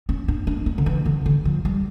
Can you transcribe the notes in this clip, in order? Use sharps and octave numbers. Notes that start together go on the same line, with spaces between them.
C#4
D4
D4
C#4
D3
E3
D3
D3
F3
G3